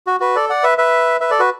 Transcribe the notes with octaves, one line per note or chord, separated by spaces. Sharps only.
F#4
F#4 B4
A4 D5
D5 F#5
B4 E5
B4 E5
B4 E5
A4 D5
F#4 B4